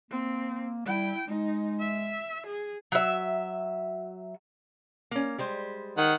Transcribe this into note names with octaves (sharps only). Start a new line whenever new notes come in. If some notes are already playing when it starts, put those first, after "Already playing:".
A#3 C4
G3 E4 G5
G#3 D#4
E5
G#4
F#3 E5
A#3 C#4
G3 G#3 C5
D#3 F#5